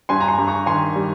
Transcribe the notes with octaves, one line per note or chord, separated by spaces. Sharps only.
G2 G#5 C6
A#5
G#5 C6
G2
A#5 C#6
D#3 G#5 C6
G3